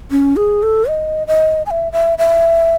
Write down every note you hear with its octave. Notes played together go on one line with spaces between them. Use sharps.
C#4
G#4
A4
D#5
D#5
G#5
E5
E5
E5